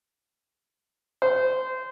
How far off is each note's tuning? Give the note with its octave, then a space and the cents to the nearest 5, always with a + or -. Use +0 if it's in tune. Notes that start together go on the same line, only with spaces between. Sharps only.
C5 -20